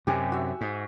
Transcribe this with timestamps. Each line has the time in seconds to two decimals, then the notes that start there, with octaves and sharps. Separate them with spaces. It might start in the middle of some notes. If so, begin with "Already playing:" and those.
0.07 F#2 C3 G4 G#5
0.32 F#4 E5
0.61 G#2